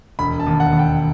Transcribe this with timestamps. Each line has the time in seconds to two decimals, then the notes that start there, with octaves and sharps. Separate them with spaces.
0.19 E1 B5
0.40 A5
0.47 D#2
0.60 F#5
0.72 D#2
0.79 G5